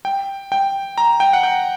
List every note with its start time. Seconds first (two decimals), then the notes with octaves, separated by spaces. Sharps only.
0.05 G5
0.52 G5
0.98 A#5
1.20 G5
1.33 F#5
1.43 G5